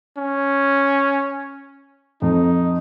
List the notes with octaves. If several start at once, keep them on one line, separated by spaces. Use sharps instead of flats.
C#4
F2 D#4